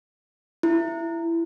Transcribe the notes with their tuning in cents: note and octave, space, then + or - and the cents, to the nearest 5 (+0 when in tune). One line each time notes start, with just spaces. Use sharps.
E4 +20